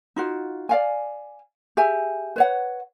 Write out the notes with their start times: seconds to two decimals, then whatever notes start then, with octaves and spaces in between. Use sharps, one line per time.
0.16 D#4 F4 F#4
0.69 D5 F5 G#5
1.77 G4 G#4 E5 G#5
2.36 B4 C#5 F#5